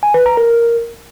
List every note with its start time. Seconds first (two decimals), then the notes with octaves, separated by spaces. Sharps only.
0.03 G#5
0.14 B4
0.26 A#5
0.37 A#4